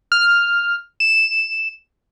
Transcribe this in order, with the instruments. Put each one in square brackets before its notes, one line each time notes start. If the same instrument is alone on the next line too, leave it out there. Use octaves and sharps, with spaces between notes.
[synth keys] F6
E7